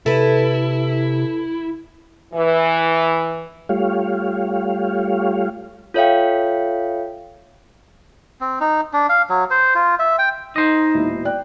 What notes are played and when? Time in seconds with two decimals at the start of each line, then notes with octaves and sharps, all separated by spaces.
0.06 C3 E4 A4 B4
2.34 E3
3.69 G3 A3 F4 G4 C#5 F5
5.94 F4 A4 C#5 E5 F5 G5
8.41 C4
8.61 D#4
8.93 D4
9.09 F5
9.29 F#3
9.51 C5
9.75 F4
9.99 E5
10.19 G5
10.56 D#4 C5 D#5
10.94 E1 A#2 E4
11.25 D5 G5 F#6